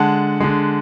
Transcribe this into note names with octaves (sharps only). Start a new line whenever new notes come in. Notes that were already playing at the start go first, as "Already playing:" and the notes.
Already playing: D3 G#3 F#5 A5
D3 G#3